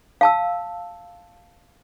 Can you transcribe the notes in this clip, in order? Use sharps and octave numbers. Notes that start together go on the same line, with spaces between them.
F5 A5 E6